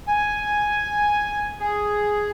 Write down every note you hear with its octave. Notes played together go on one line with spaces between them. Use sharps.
G#5
G#4